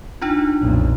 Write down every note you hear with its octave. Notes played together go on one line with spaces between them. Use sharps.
D4 D#4 F4
B1 F2 A#2